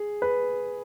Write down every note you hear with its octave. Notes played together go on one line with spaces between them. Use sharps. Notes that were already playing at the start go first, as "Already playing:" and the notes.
Already playing: G#4
B4